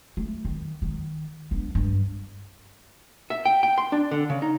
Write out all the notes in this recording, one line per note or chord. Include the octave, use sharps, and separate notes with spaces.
A3
D#3
D#3
B3 D4
G2 D4
E5
G5
G5
C6
D4
D3
C#3
D#4